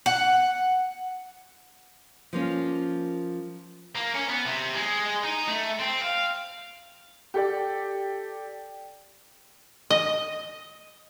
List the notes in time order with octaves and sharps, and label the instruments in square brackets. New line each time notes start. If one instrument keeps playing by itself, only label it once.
[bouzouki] F#5
[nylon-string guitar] F3 A#3 C#4
[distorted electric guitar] A#3
C#4
B3
C3
G#3
D#4
A3
C4
F5
[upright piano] G4 A4 D5
[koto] D#5